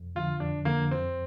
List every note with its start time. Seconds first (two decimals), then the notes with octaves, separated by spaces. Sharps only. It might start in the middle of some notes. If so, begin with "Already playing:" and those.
Already playing: F2
0.15 D3 F3 F4
0.40 F2 D4
0.65 D3 F3 A#3
0.91 F2 C4